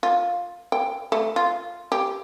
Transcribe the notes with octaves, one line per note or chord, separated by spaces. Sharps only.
F4
G5
A3
F4
G4